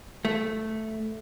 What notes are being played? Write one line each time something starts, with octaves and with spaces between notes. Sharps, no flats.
A3